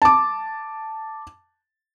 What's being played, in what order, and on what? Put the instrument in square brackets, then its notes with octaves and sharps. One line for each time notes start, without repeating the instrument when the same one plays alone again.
[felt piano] A5 D6